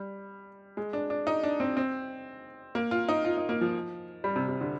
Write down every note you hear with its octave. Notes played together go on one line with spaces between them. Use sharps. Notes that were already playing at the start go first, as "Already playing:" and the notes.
Already playing: G3
G#3
D4
D4
D#4
D4
C4
C4
A#3
F4
D#4
F4
D#4
A#3
F3
G3
C3
C3
D3